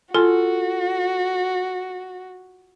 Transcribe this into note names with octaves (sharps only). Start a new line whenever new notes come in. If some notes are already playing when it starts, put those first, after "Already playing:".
F4 F#4 A4 G#5 C6